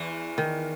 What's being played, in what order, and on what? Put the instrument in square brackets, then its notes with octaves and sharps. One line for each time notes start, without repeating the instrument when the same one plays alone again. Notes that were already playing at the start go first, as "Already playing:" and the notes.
Already playing: [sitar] E2 E3
[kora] D#3